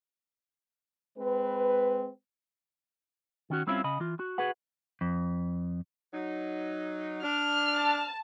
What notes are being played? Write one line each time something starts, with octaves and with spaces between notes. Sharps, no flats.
G#3 C4 B4
D#3 C#4 F#4
G3 C4 C#4 E4 F4
C#3 D#5 B5
E3 F4
F#4
F#4 G#4 B4 F#5
F2
F#3 D#4
D4 F6
A5